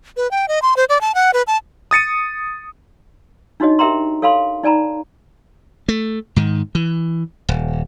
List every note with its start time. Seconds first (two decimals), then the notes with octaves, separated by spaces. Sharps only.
0.17 B4
0.31 G5
0.48 D#5
0.62 C6
0.77 C5
0.89 D5
1.01 A5
1.15 F#5
1.34 B4
1.47 A5
1.91 D#6 A6 C#7 D#7
3.60 D4 D#4 F#4 C#5 D#5
3.79 G4 A#4 E5 G5 A#5 C6
4.22 A4 C#5 F5 G#5 B5 C6
4.63 D#4 D5 G#5 A#5 B5
5.89 A3
6.36 G#2 D#3
6.75 E3
7.49 D#1